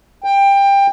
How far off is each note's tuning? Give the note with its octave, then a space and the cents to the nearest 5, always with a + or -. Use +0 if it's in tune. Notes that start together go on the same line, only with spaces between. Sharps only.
G5 +20